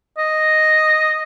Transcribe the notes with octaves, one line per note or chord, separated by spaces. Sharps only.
D#5